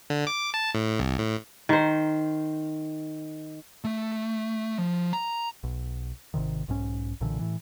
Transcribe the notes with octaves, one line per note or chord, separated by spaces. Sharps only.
D3
D6
A5
A2
C2
A2
D#3 C5
A3
F3
A#5
B1
G#1 C#2 C3 D#3
B1 G#2 C#4
B1 A#2 D3 E3
A2 E3